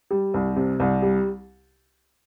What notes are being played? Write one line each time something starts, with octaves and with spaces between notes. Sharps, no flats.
G3
C2
C3
C2
G3